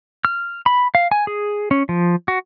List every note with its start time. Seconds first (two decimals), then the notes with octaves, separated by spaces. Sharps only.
0.25 F6
0.66 B5
0.95 F5
1.12 G#5
1.27 G#4
1.71 C#4
1.89 F3
2.28 F#4